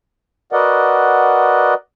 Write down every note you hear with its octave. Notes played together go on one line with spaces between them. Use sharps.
F#4 A#4 B4 D5 D#5 F#5